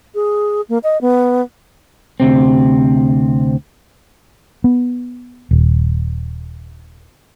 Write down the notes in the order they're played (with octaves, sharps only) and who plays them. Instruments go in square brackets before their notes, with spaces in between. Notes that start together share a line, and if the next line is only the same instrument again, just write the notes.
[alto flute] G#4
A#3
D#5
B3
[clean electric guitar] D2 C3 C4
[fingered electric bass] B3
D#1